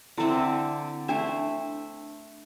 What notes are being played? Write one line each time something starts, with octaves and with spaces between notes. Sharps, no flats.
D3 C4 E4 A4 E5
A3 D4 E4 C5 E5